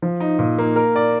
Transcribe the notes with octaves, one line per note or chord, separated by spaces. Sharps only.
F3
D#4
A#2
A#3
A#4
D5